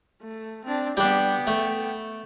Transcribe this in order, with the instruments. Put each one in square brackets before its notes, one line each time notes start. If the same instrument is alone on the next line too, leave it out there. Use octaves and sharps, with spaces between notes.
[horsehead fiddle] A3
C4 D4
[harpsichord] G3 D4 [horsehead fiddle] B3 G5
[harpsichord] A3